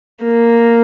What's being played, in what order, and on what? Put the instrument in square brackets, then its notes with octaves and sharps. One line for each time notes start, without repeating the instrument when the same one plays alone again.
[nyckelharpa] A#3